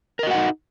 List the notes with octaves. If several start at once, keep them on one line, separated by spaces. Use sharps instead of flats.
D#4 F#4 A#4 D#5 F#5